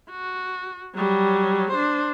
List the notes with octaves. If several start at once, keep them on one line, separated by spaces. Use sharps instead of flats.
F#4
F#3 G3
D4 C5